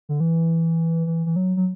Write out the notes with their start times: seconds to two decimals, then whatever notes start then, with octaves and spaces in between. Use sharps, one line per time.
0.09 D3
0.20 E3
1.07 E3
1.26 E3
1.36 F#3
1.57 F#3